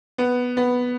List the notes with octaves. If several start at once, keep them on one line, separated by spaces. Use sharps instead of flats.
B3
B3